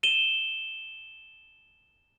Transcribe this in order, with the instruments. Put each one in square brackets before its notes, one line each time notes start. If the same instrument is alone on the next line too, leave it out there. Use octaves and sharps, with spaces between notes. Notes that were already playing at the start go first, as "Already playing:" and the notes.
[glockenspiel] D#7 E7 G7